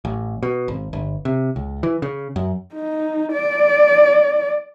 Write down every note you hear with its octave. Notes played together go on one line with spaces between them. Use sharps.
A1
B2
G#1
G1
C3
C#2
E3
C#3
F#2
D#4
D5